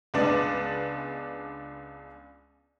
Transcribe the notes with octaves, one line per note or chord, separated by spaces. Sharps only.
C#2 G#3 B3 D4 D5